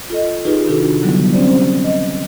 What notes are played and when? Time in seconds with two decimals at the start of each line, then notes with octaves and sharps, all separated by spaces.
0.10 F4 A4 D#5
0.45 D#4 F4 G4 G#4 B4
0.67 C3 D#3 D4 F4 F#4 A4
1.02 D3 F#3 G3 B3 E4
1.32 C4 C#4 G4 C5 D5
1.84 D#5